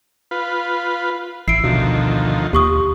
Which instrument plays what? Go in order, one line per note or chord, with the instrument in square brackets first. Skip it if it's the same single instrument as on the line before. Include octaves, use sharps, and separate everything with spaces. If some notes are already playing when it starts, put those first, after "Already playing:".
[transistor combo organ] F4 B4
[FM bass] A1 [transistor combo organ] E4 [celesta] C7 D7
[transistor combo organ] D2 D#3 F3 [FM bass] B2
[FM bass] D#2 [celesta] G4 C#6 D#6